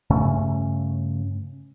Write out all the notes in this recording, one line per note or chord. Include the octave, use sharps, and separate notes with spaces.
G2 C#3 A3 C#4